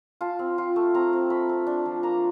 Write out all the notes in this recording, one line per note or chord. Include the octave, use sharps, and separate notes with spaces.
F4 A5
C4
F4
A3
C4 A#5
C4
A3 B5
C4
D4
F3
A#3 A#5